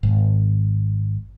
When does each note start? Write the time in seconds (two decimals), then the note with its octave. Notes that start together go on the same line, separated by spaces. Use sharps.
0.03 G#1